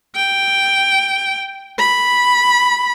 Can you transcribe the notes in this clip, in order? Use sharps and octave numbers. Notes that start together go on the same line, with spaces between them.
G5
B5